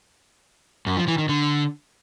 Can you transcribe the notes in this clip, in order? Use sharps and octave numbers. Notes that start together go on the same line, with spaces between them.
F#2
F3
E3
D#3
D3